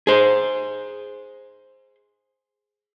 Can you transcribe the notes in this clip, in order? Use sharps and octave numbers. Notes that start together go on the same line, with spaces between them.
G#4 C5